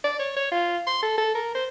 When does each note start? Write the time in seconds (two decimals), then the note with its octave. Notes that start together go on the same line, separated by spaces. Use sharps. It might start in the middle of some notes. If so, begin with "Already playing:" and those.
0.04 D5
0.19 C#5
0.36 C#5
0.52 F4
0.87 C6
1.03 A4
1.18 A4
1.35 A#4
1.55 C5